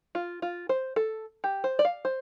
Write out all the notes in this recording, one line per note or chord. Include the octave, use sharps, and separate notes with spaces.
F4
F4
C5
A4
G4
C5
D5
F5
C5